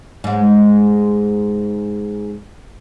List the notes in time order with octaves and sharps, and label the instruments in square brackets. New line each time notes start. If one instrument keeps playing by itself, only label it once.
[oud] G#2 G#3